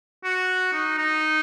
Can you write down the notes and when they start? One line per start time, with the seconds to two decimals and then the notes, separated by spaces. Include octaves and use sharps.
0.24 F#4
0.73 D#4
0.98 D#4